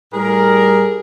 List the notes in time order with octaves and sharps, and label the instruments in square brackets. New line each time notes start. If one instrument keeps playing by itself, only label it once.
[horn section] A2 G3 G#4 A#4